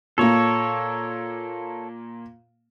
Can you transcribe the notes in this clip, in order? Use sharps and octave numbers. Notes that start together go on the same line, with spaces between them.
A#2 A#3 A4 C#5